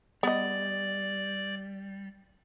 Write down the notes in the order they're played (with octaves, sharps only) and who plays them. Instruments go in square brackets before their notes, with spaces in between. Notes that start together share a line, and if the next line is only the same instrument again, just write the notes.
[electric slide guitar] G3 [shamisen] B3 D#5 [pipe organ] D5